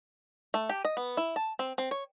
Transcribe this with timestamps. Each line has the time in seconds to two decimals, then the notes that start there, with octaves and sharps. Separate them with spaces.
0.54 A3
0.70 G4
0.85 D#5
0.97 B3
1.17 E4
1.36 A5
1.59 C4
1.78 C4
1.91 C#5